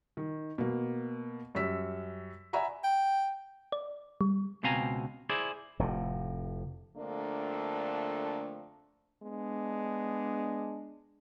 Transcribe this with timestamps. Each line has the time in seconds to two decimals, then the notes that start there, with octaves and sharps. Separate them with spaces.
0.17 D#3
0.58 B2 A#3
1.55 F#2 G3 E6 B6
2.53 D5 E5 F#5 G#5 A#5 B5
2.84 G5
3.72 D5
4.21 G3
4.63 C#2 B2 C4 F5 G#5 A#5
5.29 E4 G#4 C5 D5
5.79 F1 A2 C3
6.97 F2 D3 A3 A#3 D4
9.23 G#3 B3 D4